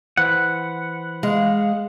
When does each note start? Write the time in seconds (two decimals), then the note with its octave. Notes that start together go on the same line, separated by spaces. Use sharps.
0.17 E3 C5 F#5 B5
1.23 G#3 F5